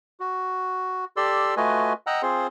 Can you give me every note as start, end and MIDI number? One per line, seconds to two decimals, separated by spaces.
0.20 1.05 66
1.17 1.55 67
1.17 1.55 69
1.17 1.55 74
1.17 1.55 84
1.17 1.55 88
1.57 1.93 57
1.57 1.93 65
1.57 1.93 66
1.57 1.93 71
1.57 1.93 75
1.57 1.93 80
2.07 2.22 75
2.07 2.22 78
2.07 2.22 79
2.07 2.22 82
2.07 2.22 88
2.07 2.22 90
2.23 2.47 60
2.23 2.47 65
2.23 2.47 68
2.23 2.47 72
2.23 2.47 84